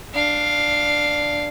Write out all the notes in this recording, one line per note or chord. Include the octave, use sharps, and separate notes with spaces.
D4 F5